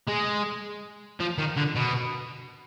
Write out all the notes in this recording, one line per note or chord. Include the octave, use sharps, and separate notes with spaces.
G#3
F3
D#3
D3
B2